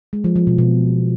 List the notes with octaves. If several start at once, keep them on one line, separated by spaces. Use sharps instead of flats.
G#3
F3
F3
B2
B2